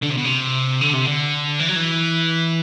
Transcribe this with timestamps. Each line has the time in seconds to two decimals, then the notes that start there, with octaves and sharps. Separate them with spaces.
0.02 D3
0.10 C3
0.17 B2
0.24 C3
0.81 D3
0.93 C3
1.06 D3
1.60 E3
1.69 F#3
1.76 E3